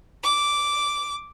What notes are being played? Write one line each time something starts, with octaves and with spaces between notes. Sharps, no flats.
D6